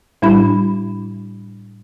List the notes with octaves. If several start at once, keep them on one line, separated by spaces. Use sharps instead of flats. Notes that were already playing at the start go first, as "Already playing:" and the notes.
A2 G3 D4 E4 B5